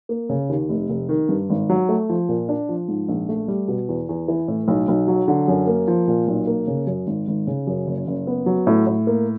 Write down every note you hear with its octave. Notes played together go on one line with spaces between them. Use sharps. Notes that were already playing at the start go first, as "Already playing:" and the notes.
A#3
C#3
D#2
F1
F1
D#3
G2
G#1
F#3
A3
F3
A#2
D4
F3
G#2
A#1
A3
G3
B2
E2
E2
E3
A2
B1
B1
F#3
D3
F#2
A#3
F3
A#2
B1
A#3
C#3
F#2
G#1
G#1
C#3
F#2
F#1
F#1
B3
F#3
A2
A2
A#3